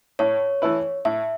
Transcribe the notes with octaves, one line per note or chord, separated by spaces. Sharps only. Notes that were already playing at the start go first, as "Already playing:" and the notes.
A2 C#5
E3 A3 E4 B4
A2 E5